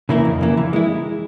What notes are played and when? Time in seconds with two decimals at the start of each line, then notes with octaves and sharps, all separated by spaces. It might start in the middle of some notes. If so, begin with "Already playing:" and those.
0.09 C#3 E3 A#3 E4
0.25 F2
0.41 C#3 E3 A#3 E4
0.57 E3
0.73 G#3 E4